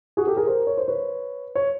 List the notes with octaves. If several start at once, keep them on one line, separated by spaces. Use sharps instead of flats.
F#4 G#4
G4 A4
G#4 A#4
A#4 C5
C#5
C5
B4 C#5
C#5